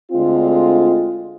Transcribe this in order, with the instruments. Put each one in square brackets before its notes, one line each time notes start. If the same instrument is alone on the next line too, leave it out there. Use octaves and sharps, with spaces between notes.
[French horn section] D2 D3 G#3 C4 F4